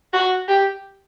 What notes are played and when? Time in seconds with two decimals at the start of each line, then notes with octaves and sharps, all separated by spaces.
0.13 F#4
0.48 G4